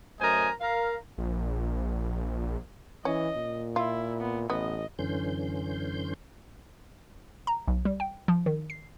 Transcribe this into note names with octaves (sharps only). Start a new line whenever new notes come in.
F#2 A3 A#4 C5 D#5 G#5
A#4 F5
A#1
E3 C#4 D#5
A#2
E4 F4
B3
A1 B3 D#5
F#2 D3 E3 C#4 C6 G6
A#5
B1
G3
G5
F3
D#3
C7